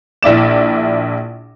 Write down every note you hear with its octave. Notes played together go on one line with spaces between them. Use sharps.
A#1 E4 D5 E7